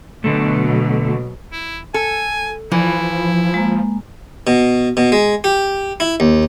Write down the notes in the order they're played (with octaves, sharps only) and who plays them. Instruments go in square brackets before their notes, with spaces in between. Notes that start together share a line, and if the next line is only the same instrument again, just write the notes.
[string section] B2 F#3 [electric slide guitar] D3 A3
[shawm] E4
[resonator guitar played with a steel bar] A4 [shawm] G#5
[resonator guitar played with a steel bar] E3 [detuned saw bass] F3 [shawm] E4
[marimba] G#3 A#3
[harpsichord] B2
B2
G#3
G4
E4
D#2